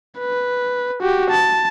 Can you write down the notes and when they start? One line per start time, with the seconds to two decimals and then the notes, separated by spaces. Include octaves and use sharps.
0.19 B4
1.01 F#4 G4
1.31 A5